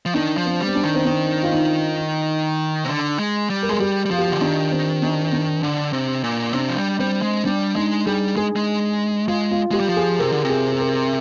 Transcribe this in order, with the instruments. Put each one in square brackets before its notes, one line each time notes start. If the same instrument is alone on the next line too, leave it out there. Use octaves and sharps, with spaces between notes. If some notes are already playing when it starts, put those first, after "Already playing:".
[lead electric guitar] F3
[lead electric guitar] D#3 [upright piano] D4
[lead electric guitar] F3
[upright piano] C4
[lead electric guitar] G3
[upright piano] C4
D4
[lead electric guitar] D#3
[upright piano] C4
D4
F4
D#4
[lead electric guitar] C3
D3
G#3
G3
[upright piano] A#4
[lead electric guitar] G#3 [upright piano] G#4
[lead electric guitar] G3 [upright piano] G4
[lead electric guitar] G3
[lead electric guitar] F3 [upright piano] F4
[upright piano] G4
F4
[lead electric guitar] D3
[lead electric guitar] D#3 [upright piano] D4
[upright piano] C4
D4
D4
[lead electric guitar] D3
C3
A#2
[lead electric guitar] C3 [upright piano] D4
[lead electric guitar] F3
G3
[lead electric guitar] G3 [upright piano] C4
[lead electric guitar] G#3
[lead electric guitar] G3 [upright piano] D4
[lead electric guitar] G#3 [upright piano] D#4
[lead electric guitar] G3 [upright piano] G#4
[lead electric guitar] G#3 [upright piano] G#4
[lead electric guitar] G#3
[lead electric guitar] G#3 [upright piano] F4
[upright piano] F4
[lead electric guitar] G#3 [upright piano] G4
[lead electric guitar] G3
F3
[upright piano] G#4
[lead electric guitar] C3 [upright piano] A#4
[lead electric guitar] D3
C3
[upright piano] G#4
G#4
A#4